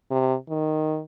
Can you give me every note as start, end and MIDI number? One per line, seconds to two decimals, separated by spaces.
0.11 0.34 48
0.49 1.00 51